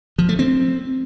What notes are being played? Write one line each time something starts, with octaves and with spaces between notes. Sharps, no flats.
F3
A3
C4